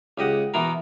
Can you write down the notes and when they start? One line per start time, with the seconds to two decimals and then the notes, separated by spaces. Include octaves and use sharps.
0.18 C#2 G4 D#5 F#5
0.54 B2 E3 B3 A#4 A#5